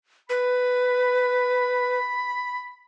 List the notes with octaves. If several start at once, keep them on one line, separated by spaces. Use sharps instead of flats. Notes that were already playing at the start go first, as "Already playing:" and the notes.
B4 B5